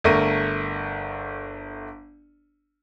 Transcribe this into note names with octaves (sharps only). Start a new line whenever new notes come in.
G1 A3 A#4 C#6 D#7